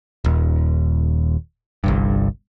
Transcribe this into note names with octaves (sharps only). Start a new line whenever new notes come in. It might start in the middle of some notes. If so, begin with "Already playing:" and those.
D#1 D#2
G1 C2 G2